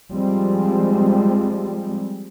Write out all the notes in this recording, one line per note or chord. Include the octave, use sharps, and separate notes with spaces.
F3 G3 G#3 C4